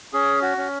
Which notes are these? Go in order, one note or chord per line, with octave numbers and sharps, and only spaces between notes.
C#4 G#4
F#4
C#4